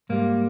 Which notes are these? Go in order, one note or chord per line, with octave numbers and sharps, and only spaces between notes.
G#2 G3 A#3